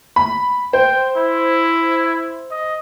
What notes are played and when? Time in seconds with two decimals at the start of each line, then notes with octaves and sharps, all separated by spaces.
0.16 B5
0.73 C5 G5
1.16 E4
2.51 D#5